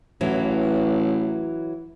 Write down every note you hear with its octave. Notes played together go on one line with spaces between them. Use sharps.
A1 E3 F#3